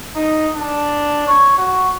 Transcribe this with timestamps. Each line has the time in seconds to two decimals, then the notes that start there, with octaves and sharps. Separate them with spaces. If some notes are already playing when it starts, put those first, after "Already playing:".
0.15 D#4
0.55 D4
1.27 C#5
1.58 F#4